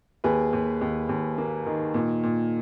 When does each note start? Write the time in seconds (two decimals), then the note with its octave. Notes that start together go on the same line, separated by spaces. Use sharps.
0.24 D#2 G#4 B4
0.53 D#2
0.81 D#2
1.09 D#2
1.38 A#3
1.66 D#3
1.94 A#2
2.23 A#2